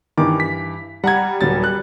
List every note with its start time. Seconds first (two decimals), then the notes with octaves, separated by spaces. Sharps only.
0.18 G2 D#3 E3 D6
0.40 B6
1.04 G3 F#5 A#5 G#6
1.41 D#1 F#3 A6
1.64 F#6